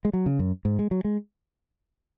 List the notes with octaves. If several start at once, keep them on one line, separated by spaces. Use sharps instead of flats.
G#3
F#3
C#3
F#2
G#2
G#3
F#3
G#3